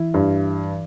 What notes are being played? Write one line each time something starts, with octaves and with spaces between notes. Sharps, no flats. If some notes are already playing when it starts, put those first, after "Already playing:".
Already playing: E3 E4
G2